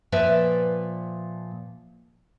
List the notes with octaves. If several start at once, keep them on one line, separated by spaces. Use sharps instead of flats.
A#2 F3 B4 D5 E5